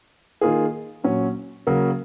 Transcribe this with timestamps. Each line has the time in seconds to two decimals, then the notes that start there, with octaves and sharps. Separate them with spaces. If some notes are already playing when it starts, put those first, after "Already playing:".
0.41 D#3 A#3 F4 G#4
1.04 A#2 F#3 C#4
1.67 C#3 F#3 A#3